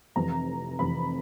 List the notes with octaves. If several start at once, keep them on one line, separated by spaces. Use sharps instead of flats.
F1 F2 C3 E3 A#5
F1 F2 C3 E3 B5